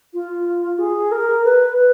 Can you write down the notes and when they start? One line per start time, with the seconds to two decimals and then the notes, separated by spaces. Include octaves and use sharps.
0.14 F4
0.79 G#4
1.12 A#4
1.45 B4
1.77 B4